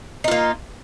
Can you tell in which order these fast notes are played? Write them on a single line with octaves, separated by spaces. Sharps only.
D#4 F4 A#3